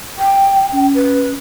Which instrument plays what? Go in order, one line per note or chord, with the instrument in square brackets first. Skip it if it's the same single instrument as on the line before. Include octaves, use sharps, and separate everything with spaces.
[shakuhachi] G5
[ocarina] C#4
[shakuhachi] B4